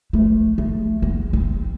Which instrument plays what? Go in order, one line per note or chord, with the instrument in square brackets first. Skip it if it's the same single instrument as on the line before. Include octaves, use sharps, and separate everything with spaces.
[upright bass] A3
A3
B3
C4